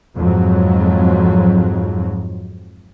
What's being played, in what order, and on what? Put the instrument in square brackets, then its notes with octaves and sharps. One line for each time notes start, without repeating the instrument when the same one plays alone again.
[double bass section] F2 G#2 F#3